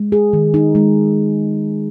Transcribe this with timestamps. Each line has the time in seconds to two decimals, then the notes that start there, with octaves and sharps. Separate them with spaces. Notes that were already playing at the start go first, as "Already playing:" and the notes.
Already playing: G#3
0.12 G#4
0.33 D#3
0.54 D#4
0.75 G#3